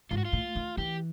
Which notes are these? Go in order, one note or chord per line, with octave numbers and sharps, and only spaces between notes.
G#2 F4
F#4
F4
A2
D#3
E3 G4